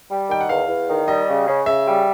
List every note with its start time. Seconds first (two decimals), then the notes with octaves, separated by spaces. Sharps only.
0.10 G3
0.29 D#3 G5
0.41 F#5
0.49 E2 F5
0.68 E2
0.88 D#3
1.08 G3 D#5
1.28 C#3
1.47 C#3
1.66 C#3 E5
1.86 G3